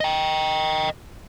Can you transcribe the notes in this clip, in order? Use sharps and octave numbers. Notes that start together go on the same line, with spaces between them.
D#5 G5